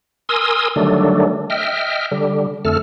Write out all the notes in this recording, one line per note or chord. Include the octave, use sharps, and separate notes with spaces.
A#4 G#5 C6 D#6 E6
D3 D#3 F#3 G3 A3 D4
D#5 E5 G5 F6
D3 G3
F2 D3 A3 A4 F6